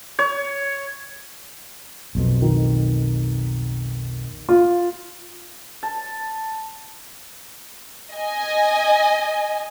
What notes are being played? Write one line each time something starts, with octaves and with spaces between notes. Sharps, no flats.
C#5
B1 F2 B2
D#3
F4
A5
D#5 G#5